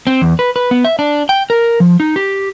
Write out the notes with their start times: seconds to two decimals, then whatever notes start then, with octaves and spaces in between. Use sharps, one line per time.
0.07 C4
0.22 E2
0.39 B4
0.56 B4
0.71 B3
0.84 E5
0.99 D4
1.29 G5
1.50 A#4
1.80 F3
2.00 D#4
2.16 G4